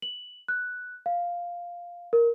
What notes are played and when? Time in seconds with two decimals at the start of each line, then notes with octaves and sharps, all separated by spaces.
0.02 F#7
0.48 F#6
1.06 F5
2.13 A#4